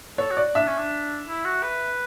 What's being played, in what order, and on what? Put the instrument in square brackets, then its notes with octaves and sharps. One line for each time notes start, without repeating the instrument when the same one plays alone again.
[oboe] A4 [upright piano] C#5
[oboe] F#4
[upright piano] D5
[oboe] D4 [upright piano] E5
[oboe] C#4
D4
E4
F#4
B4